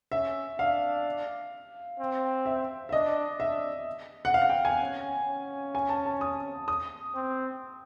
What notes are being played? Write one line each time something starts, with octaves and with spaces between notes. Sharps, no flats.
C#4 E5
D4 F5
C4
E5
E5
D4 D#5
D4 E5
F#5
F5
F#5
G5
G#5
C#4
C#4
G#5
A5
A5
D#6
D#6
C4